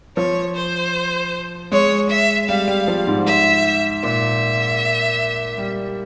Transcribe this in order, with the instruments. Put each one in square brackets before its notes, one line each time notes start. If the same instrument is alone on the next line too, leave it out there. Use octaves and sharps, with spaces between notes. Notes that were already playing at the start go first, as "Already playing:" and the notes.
[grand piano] F3 [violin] C#5
[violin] C5
[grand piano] G#3 [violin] C#5
[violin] E5
[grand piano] G3 [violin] F5
[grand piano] G3
F3
G#2
[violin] E5
[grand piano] A#2 [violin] E5
[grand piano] G3